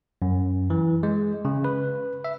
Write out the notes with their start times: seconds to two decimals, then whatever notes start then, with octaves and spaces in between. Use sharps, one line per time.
0.22 F#2
0.70 E3
1.03 G#3
1.45 C#3
1.64 B4
2.24 E5